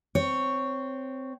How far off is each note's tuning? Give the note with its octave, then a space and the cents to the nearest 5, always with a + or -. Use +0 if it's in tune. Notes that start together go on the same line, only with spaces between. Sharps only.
C4 -10 C#5 +0